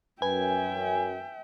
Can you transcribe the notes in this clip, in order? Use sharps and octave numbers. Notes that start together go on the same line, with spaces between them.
F#2 B4 E5 G5 G#5